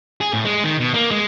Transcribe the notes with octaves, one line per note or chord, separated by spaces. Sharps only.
G#4
A2
G#3
D#3
B2
A#3
G#3